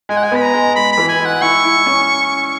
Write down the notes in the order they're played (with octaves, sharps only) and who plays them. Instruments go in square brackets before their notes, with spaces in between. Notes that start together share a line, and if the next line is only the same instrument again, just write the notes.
[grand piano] G#3 [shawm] G#5
[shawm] F#5
G#5
[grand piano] B3 [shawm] B5
[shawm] A#5
[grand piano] G#3
[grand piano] G#3 [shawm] B5
[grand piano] E3 [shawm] B5
[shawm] G#5
[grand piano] G#3
[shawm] F#5
[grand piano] E4 [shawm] C#6
[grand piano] E4
C#4